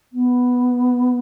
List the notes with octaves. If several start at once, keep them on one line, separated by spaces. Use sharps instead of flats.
B3